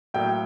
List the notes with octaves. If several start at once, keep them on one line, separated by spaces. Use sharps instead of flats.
A2 F#3 A#3 G5